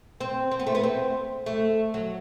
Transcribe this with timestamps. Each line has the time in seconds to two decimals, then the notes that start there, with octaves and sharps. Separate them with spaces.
0.21 C4
0.51 C4
0.60 B3
0.66 A3
0.75 B3
0.83 C4
1.46 A3
1.94 F#3